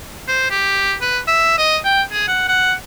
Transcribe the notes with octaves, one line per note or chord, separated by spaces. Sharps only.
C5
G4
B4
E5
D#5
G5
G#4
F#5
F#5